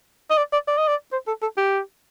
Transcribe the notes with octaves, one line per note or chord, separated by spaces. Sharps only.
D#5
D5
D5
D5
D#5
D5
C5
A4
A4
G4